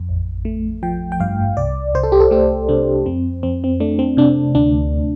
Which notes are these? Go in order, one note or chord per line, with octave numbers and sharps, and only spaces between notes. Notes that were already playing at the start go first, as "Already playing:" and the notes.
Already playing: F2
A1
A3
F3 G5
G5
G2 F5
C2 D5
C2 C5
A4
G4
A4
A3 G4
C3 D4
F2 C4
F2 C4
C4
A3 D4
C4
C3 D4
D2 D4